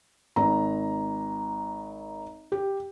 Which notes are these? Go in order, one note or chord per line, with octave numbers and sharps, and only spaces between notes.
G#1 A#5
G4